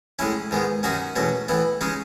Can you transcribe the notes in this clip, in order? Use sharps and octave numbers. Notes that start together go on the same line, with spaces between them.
A2 G#3 C#4 E4
G#2 D#3 G#3 B3
F#2 D#3 F#3 C#4 D#4 F#4
E2 B2 F#3 A3 C#4
A2 E3 B3 E4
C#3 G#3 C#4 D#4